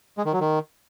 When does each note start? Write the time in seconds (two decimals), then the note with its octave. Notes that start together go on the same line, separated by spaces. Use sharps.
0.18 G#3
0.25 D#3
0.33 F#3
0.40 D#3